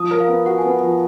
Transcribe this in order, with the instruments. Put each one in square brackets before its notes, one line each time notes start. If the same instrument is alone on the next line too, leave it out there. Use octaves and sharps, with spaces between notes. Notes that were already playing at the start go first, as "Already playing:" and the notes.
Already playing: [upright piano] F3 [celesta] D#6
[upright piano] A#4
[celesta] F5
[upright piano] B3
[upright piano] F#4 [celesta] F#5
[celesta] G#5
[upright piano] B3
[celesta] F#5
[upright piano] F3